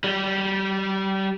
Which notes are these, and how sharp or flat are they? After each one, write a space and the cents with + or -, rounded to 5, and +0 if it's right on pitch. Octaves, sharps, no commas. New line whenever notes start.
G3 -25